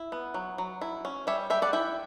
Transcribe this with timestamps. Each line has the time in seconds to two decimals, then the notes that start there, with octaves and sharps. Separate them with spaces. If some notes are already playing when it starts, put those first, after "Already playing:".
Already playing: E4
0.12 B3
0.34 F#3
0.58 F#3
0.81 E4
1.05 C#4
1.27 G3 C#5 E5
1.50 G3 E5 G5
1.62 D5 F#5
1.73 E4 E5 G5